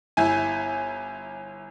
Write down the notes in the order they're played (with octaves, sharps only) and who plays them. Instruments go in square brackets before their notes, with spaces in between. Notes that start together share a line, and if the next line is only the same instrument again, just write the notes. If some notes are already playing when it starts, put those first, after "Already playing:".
[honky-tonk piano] G1 E4 G#5